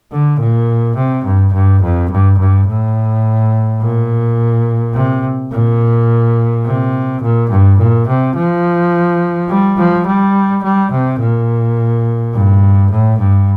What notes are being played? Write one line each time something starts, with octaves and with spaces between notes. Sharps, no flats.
D3
A#2
C3
G2
G2
F2
G2
G2
A2
A#2
C3
A#2
C3
A#2
G2
A#2
C3
F3
G3
F3
G3
G3
C3
A#2
G2
A2
G2